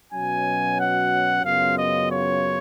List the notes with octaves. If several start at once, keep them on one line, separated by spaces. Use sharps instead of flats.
B2 F#3 C#4 G#5
F#5
F#2 C#3 F#3 B3 F4 F5
D#5
C#5